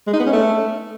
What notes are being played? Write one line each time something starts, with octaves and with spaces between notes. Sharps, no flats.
G#3
D#4
B3
C#4
A3